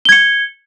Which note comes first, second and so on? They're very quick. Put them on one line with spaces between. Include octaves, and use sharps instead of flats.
G7 G#6 C#7